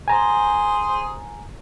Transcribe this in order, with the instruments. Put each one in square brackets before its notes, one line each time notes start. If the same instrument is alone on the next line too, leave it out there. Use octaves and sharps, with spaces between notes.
[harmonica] G#4 C5 [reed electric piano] G#5 A#5